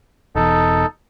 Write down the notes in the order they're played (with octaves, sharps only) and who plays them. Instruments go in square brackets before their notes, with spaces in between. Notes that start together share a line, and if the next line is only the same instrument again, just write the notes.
[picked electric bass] E1 E2 [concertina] D#4 A4